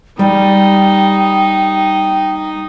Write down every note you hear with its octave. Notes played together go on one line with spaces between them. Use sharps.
G3 D#4 G5